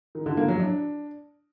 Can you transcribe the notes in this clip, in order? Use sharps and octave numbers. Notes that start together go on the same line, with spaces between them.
D#3
D3
A#3
F#3
D4